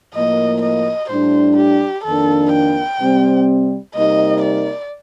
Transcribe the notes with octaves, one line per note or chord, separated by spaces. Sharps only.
A2 F3 A#3 D#5
D#5
A2 G3 D4 C5
G4
F2 D#3 A#3 D4 A4
G5
C3 G3 C4
C3 G3 A#3 D#4 D#5
D5